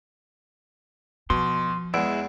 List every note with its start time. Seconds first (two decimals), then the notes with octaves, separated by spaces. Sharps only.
1.30 B2 F3 C6
1.94 E2 G#3 E4 D7